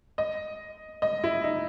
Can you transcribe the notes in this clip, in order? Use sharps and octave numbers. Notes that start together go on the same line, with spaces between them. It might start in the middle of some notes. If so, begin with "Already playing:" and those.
D#5
D#5
E4
D#4